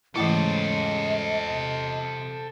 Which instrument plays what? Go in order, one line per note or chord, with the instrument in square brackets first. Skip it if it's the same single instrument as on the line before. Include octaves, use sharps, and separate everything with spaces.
[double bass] G#2 C#3 [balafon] E3 A3 E4 [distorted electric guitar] A4 C5 [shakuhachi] D#5
[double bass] C3